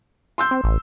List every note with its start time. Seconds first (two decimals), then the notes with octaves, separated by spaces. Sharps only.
0.38 C6 E6 G6
0.51 C4
0.64 A1